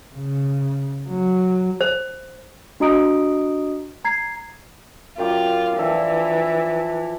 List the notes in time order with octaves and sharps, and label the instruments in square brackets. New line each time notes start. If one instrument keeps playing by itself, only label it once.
[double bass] C#3
F#3
[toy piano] C5
[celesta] D4 F#4 D#5 A#5 D#6 D7
A#5 G#6 C7
[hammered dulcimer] F#2 G5 D6 [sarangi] F4
[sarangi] E3 [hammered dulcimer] F3 D4 A4